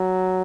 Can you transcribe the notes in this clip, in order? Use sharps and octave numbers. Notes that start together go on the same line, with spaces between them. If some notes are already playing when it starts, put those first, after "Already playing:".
Already playing: F#3